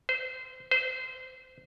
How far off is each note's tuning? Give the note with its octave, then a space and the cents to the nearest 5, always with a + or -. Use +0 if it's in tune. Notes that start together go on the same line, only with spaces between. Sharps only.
C5 -25
C5 -25